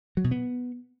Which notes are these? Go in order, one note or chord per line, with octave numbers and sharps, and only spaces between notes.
F#3
B2
B3